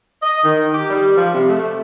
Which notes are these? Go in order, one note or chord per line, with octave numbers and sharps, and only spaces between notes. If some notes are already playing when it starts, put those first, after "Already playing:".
D#5
D#3
G4
G3
F3
C3
A3